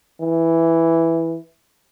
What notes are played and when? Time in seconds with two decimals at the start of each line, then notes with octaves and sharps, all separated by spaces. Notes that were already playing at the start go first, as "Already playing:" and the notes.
0.21 E3